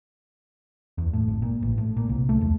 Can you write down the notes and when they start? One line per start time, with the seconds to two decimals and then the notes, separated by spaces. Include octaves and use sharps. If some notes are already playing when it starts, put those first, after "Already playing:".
0.98 E2
1.13 A2
1.28 G#1
1.42 A#2
1.62 A1
1.78 A2
1.97 A#2
2.09 C2
2.29 A3
2.41 E2